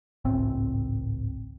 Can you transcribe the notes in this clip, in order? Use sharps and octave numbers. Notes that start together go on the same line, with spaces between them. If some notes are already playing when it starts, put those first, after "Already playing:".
G#1 C#2 A2 C4